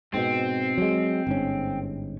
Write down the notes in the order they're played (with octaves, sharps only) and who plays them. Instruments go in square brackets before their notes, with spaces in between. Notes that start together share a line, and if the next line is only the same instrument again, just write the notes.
[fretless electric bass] G#2 B2 [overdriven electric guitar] C4
[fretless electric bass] F#3 G#3
G1 G#2 C#4